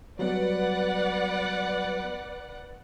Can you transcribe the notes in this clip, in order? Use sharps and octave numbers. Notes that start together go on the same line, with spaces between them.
F#3 G3 B3 B4 D5 F#5